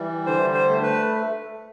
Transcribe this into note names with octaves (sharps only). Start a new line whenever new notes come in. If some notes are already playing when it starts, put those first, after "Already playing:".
Already playing: E3 G3
D3 C5
C5
A3
B4